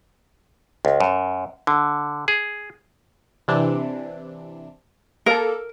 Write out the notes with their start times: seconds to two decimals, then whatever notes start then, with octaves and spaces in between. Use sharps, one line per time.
0.85 C#2
1.00 F#2
1.67 D3
2.28 G#4
3.48 C3 E3 D4
5.26 A#3 A4 A#4